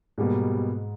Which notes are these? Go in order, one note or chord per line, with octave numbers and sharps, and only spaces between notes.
G#2 B2 G3 G#3 A#3